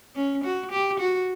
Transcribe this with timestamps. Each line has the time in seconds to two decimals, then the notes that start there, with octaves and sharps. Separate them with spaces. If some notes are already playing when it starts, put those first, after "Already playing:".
0.15 C#4
0.44 F#4
0.71 G4
0.99 F#4